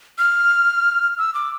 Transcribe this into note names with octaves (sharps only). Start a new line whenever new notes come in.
F6
E6
D6